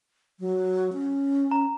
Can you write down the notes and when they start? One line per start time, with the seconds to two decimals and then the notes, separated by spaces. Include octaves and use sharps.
0.40 F#3
0.93 C#4
1.51 A#5